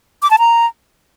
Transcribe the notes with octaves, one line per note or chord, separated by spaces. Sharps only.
D6
A5
A#5